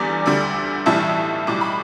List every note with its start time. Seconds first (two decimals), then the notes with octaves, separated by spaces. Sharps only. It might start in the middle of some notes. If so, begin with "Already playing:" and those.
Already playing: E2 D3 G3 D5
0.26 D2 D3 G3
0.86 B1 A2 E3 G3 E5 A5
1.47 B1 A2 G3 D6
1.61 B5